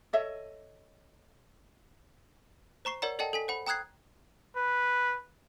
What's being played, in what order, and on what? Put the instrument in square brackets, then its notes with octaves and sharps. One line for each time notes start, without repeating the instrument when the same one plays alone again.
[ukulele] A4 C#5 D#5 E5
[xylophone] C5 A#5 C#6 C7
A#4 C#5 D5 F#5 A#5
A4 D5 D#5 F#5 G5 A5
A4 G#5 B6
C5 F#5 B5
G5 A#5 D#6 F#6 G#6 C7
[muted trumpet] B4